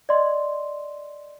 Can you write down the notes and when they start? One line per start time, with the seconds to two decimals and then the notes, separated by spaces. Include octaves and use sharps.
0.09 D5 D#5 C6